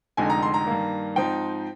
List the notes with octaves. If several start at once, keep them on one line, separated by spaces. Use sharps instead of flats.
F1 F2 D3 G#3 D#4 G#5
A#5
C6
A#5
G2 D#3 A#3
G#2 F3 C4 D#4 G5